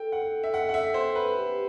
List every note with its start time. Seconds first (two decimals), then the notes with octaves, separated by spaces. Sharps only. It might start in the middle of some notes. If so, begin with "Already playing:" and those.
Already playing: A4 G5
0.12 F#5
0.44 E5
0.54 F#5
0.69 F#5
0.74 E5
0.94 C5
1.15 B4
1.35 G4